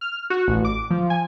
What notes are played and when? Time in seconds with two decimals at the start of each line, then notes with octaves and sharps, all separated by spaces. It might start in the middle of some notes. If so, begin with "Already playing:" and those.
0.01 F6
0.30 F#4
0.48 A1
0.65 D6
0.90 F3
1.10 G#5